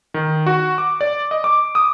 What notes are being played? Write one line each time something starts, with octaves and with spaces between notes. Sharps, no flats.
D#3
F#4
D6
D5
D#5
D6
D#6